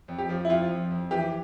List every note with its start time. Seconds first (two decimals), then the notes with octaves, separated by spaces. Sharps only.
0.08 F2
0.18 G4
0.29 F3
0.45 E4
0.50 F2 F4
0.70 F2
0.91 F2
1.11 E3 G4